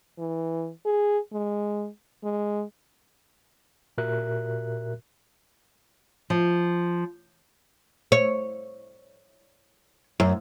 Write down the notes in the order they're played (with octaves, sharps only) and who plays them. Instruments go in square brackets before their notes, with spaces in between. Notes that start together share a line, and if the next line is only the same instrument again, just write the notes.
[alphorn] E3
G#4
G#3
G#3
[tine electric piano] A#2 F#4 G4 A#4 E5 F#6
[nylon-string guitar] F3
[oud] C#5
F#2